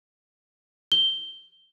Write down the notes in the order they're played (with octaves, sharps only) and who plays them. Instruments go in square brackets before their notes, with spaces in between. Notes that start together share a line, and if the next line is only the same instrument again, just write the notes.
[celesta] G7